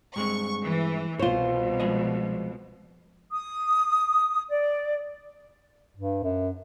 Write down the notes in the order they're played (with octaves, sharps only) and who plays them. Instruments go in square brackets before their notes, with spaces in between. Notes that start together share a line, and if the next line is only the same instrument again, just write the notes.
[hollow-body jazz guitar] G2 G#3 C4 [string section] C#6
[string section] E3
[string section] C2 B2 [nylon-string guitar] F4 C5 [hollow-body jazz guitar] C#5 C6
[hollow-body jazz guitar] F3 G#3 D#5
[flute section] D#6
D5
[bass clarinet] G2
F#2